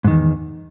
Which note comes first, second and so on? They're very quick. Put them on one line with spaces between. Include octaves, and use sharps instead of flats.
G#2 D#3 E2